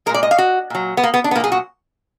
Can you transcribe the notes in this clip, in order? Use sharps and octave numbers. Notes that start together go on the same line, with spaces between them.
A#2 G#3 A#4
D5
D#5
F5
F#4
A#2 F#3
B3
A#3
B3
D4
B3
A#2 F#3 A#3 G#4
F#4